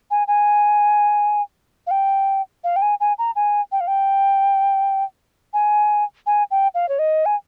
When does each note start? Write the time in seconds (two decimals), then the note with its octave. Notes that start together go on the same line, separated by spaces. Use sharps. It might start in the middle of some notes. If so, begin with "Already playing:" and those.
0.11 G#5
0.28 G#5
1.87 F5
1.91 G5
2.64 F5
2.76 G5
2.82 G#5
3.00 G#5
3.18 A#5
3.36 G#5
3.72 G5
3.80 F5
3.87 G5
5.53 G#5
6.26 G#5
6.51 G5
6.75 F5
6.89 C#5
6.99 D#5
7.25 G#5